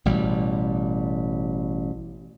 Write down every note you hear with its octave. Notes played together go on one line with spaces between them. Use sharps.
A1 B2 G3